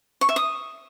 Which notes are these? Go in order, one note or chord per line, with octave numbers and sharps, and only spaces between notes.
C#6
E5
D#6